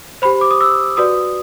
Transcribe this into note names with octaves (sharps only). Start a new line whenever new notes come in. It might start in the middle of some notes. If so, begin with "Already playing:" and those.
G4 C5 B5
D6
D#6
E6
F#4 B4 D5 D#6